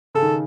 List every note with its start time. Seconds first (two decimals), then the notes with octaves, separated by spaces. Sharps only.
0.15 C#3 A4
0.22 D#3